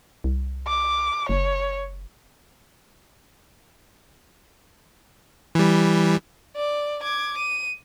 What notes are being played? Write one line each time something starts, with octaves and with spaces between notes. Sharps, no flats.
C2
D6
F#1 C#5
E3 G3
D5
D6 G#6
D#7